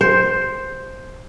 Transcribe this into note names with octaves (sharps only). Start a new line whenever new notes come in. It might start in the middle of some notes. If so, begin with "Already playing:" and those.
C5